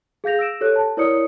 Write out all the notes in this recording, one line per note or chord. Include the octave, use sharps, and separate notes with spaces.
G#4 F5 G6 A#6 F7
E6 A#6 D7 E7
G4 A4 C#5 F#6
A5
E4 A#4 C#5 D5 D#6 C#7